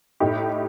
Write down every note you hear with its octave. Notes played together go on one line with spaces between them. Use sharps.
A2 A3 D#4 G4